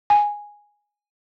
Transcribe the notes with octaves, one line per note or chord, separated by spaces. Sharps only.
G#5